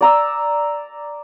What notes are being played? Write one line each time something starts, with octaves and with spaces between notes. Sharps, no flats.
D5 A#5 E6